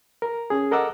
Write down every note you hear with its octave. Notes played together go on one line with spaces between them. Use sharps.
A#4
C#4 G#4
A4 A#4 D#5 F#5 D6 E6